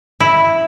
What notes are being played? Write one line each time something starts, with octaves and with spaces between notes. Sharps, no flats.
E4